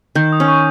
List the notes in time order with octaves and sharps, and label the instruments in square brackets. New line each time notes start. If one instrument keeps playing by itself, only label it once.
[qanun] D#3 [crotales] G6
[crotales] D#6
[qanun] C#4
[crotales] C#6